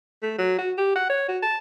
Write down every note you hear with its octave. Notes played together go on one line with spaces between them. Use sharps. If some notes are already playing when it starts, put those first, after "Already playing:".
A3
F#3
F#4
G4
F#5
C#5
F#4
A5